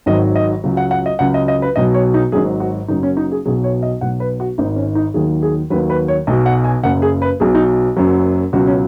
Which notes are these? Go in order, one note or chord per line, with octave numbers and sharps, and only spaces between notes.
G#1 G#2 D#3 F#3 D#5
D#5
C#2 C#3 F#3
F#5
F#5
D#5
C#2 C#3 F#3 F#5
D#5
D#5
B4
B1 B2 F#3 D#5
C#5
D#4
G#1 G#2 F#3 G#4
F#4
F#1 F#2 C#3 F#3 D#4
C#4
D#4
G#4
B1 B2 F#3 G#4
C#5
D#5
B1 B2 F#3 F#5
B4
F#4
G#1 G#2 D#3 D#4
C#4
D#4
D#2 D#3 F#3 G#4
G#4
D#2 D#3 F#3 B4
B4
C#5
B1 B2 F#3 D#5
F#5
G#5
F#1 F#2 C#3 F#5
G#4
B4
B1 B2 F#3 G#4
D#4
F#1 F#2 F#3
C#2 B2 F#3 F#4
C#4